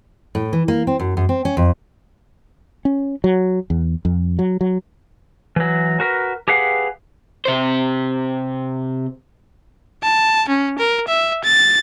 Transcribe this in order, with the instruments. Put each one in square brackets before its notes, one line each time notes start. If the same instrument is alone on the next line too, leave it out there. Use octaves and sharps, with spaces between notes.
[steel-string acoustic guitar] A2
E3
A#3
C4
F#2
F#2
C4
C#4
F2
[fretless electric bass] C#4
F#3
E2
F2
F#3
F#3
[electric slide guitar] E3 F#3
F#4 A#4 B4
G4 G#4 B4 F5 F#5
[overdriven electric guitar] C3 C5
[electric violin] A5
C#4
A#4
E5
A6